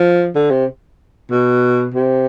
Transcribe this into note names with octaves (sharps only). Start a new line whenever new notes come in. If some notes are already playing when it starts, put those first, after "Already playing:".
Already playing: F3
D3
C3
B2
C3